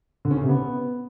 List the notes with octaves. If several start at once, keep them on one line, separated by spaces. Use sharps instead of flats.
D3
C#4
C#3
C3
B3